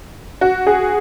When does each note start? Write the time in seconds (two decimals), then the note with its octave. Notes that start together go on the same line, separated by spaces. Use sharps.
0.41 F#4
0.67 G#4